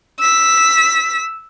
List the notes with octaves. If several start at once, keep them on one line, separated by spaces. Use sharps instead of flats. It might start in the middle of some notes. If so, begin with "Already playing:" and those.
E6 B6